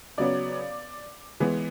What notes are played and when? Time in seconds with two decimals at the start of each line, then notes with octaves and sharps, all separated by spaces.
0.18 C#3 F#3 B3 D5 D6
1.40 E3 G#3 B3